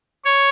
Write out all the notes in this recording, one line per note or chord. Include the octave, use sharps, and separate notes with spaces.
C#5